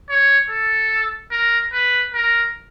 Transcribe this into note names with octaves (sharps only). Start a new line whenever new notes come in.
C#5
A4
A#4
B4
A#4